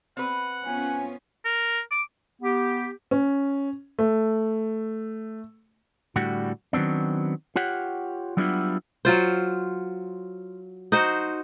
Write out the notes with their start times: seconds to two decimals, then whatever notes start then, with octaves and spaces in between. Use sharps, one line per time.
0.17 C4 B4 F#5
0.64 B3 C#4 F4 G#5
1.45 A#4
1.91 D6
2.41 B3 G4
3.11 C#4
3.99 A3
6.16 A2 D3 G3 F#4
6.73 D#3 F#3 B3 C4 D4
7.56 F4 G4 C#5 F#5
8.37 F#3 G3 B3 D4 E4 F4
9.05 F#3 F4 C5
10.92 D#4 F#4 C5